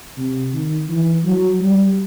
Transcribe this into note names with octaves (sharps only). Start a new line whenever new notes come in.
C3
D#3
E3
F#3
G3